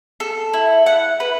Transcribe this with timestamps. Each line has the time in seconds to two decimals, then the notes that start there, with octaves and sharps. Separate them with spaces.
0.20 A4
0.54 E4
0.86 F#5
1.20 B4